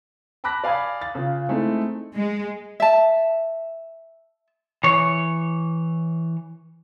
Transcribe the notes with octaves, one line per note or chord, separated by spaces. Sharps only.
A5 B5 D6 F#6 A#6 B6
D5 F5 G#5 B5 D#6 G#6
A6
C#3 F4
G#3 A3 C4 D#4 E4
G#3
E5 A5
E3 C#5